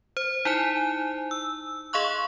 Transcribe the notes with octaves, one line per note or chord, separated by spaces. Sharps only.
C5
D#4 E4 C5 G#5
E6
G#4 D#5 F5 C6 C#6 F#6